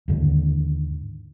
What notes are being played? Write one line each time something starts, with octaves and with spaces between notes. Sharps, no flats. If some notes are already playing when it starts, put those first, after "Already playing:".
D#2 G#2 D3